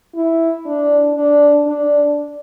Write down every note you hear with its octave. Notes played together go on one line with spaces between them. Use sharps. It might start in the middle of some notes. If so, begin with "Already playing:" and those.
E4
D4
D4
D4